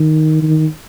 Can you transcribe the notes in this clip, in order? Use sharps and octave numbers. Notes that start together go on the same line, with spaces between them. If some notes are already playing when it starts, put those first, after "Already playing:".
Already playing: D#3
D#3